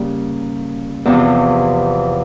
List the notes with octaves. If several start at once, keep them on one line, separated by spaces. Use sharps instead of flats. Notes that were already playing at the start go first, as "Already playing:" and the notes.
Already playing: C#3 G3 A#3 C#4
E2 C3 F3